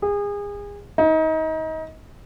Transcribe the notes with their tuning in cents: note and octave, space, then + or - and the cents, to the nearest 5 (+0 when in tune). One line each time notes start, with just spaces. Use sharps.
G#4 -30
D#4 +30